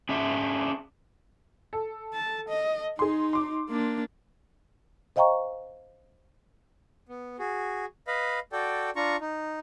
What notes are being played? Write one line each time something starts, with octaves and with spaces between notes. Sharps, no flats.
C#4 D4 G#4 E5
A4
A5
D#5
D#4 G#4 C6
C6 D6
A#3 D4
C5 D#5 F5 G5 A#5 C#6
B3
F#4 G#4
B4 D#5 F5 B5
F#4 A4 D5 G5
D4 F4 A#5 C#6
D#4